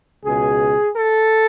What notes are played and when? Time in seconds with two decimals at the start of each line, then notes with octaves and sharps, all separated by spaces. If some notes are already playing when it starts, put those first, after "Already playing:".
0.25 C#2 B2 G#4
0.96 A4